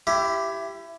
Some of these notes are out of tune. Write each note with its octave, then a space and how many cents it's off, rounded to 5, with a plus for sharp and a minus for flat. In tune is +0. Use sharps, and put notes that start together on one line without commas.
E4 +20 G4 -5